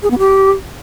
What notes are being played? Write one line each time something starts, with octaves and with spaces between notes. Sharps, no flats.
G#4
B3
G4